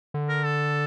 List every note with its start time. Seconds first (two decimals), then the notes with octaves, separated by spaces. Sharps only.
0.14 D3
0.29 A#4
0.44 A4